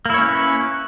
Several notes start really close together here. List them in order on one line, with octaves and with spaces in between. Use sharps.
A#3 E4 C#5 C#4 B4